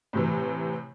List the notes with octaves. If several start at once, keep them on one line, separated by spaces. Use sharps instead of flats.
A2 C3 E3